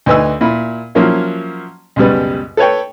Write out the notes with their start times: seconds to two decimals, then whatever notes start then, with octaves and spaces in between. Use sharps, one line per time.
0.06 D2 D#4 B4 G#5 E6
0.41 A#2 E4 B5
0.95 F3 F#3 A#3 C#4 E4
1.96 C#2 F#2 B2 G3 B4
2.57 A4 B4 C#5 G5